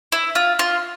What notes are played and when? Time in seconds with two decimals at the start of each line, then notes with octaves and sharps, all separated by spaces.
0.12 E4
0.35 F4
0.59 F4